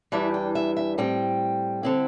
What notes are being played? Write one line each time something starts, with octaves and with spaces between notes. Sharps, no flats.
E2 E3 G3 D4 E5
G5
E5
E5
A2 G3 C4 G5
D3 C4 E4